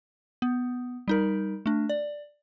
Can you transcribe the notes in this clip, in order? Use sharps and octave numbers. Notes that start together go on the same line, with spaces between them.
B3
G3 D#4 A#4
A3 D4
D5